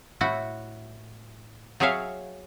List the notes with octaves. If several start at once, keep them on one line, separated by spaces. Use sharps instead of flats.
A2 E4 F#4
F#3 G#4 C#5 E5 F5